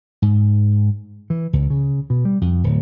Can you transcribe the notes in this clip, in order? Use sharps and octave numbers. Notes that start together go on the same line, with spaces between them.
G#2
E3
C#2
C#3
B2
G3
F2
D1